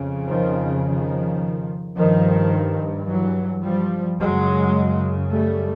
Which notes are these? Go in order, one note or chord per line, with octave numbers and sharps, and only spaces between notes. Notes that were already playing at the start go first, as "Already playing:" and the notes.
Already playing: F2 C#3
D#3 F3
D#3 F3
G2 D#3 F3
E3 F#3
F3 G3
F#2 C#3 F#3 G#3
G3 A3